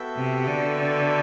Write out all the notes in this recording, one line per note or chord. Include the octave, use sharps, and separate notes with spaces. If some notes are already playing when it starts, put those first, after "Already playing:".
Already playing: B3 F#4 A4 E5 G5
C3
D3